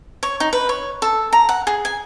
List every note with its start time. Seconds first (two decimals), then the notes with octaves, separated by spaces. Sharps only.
0.23 C#5
0.40 D#4
0.53 B4
0.69 C#5
1.02 A4
1.33 A#5
1.49 F#5
1.67 G#4
1.85 G#5